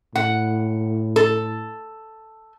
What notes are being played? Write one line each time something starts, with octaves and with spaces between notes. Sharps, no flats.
A2 F#5
A4